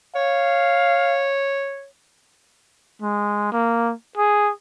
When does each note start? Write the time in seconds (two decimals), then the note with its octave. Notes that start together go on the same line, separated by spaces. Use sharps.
0.15 C#5 F5
3.02 G#3
3.52 A#3
4.18 G#4